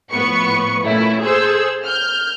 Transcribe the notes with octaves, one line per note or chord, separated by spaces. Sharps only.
A2 F3 B3 B4 C#6 C#7
A#2 A3 C#4 E4
G#4 A4 C5 E6
F6 G6